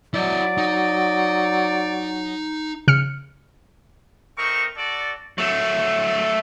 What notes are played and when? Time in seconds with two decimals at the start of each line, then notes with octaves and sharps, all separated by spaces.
0.14 F#3 E4 D5 D#5
0.58 D#4
2.88 C#3 F6 C#7
4.38 A3 C4 D#4 A#4 C#6
4.78 F#4 A4 D5
5.38 F#3 A3